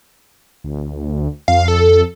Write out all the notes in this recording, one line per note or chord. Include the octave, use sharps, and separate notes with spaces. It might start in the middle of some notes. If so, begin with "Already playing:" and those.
D2
F2 F5
A4